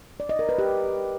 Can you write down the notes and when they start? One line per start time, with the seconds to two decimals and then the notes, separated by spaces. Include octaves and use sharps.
0.20 D5
0.29 D#5
0.39 A#4
0.49 B4
0.59 G4